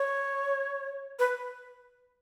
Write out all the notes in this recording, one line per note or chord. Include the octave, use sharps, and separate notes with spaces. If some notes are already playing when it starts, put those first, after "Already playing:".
Already playing: C#5
B4